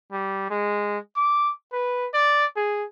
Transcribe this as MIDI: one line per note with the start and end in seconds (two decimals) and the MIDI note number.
0.12 0.49 55
0.50 0.98 56
1.16 1.52 86
1.72 2.07 71
2.14 2.46 74
2.56 2.85 68